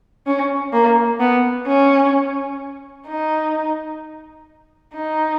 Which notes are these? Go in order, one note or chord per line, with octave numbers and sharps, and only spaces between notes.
C#4
A#3
B3
C#4
D#4
D#4